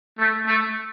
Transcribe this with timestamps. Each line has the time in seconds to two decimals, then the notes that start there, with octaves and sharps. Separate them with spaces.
0.19 A3
0.47 A3